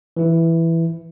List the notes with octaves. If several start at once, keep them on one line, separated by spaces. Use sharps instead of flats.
E3 E4